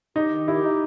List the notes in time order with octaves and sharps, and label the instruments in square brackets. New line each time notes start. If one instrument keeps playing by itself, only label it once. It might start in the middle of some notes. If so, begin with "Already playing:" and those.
[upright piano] D#4 [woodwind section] G4
[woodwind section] D#3
[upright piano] E4 [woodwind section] G4
[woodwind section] D#4